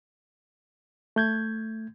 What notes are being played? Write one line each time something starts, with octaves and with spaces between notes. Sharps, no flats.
A3 G6 G#6